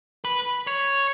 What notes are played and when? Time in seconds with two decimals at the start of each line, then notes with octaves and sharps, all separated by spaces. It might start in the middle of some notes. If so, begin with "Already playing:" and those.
0.25 B4
0.67 C#5